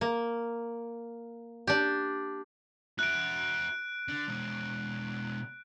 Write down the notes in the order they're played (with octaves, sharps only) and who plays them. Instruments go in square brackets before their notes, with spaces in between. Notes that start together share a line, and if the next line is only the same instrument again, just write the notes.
[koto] A#3
D4 G4
[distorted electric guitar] F#4 E5 [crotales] F#6 D7
[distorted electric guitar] D3
B2 G#3